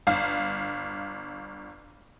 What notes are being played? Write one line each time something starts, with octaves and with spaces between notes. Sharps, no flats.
G1 F5